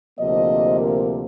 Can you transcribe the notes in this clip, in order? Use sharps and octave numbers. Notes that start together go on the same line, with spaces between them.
D2 C3 F3 A#3 D#5
A#4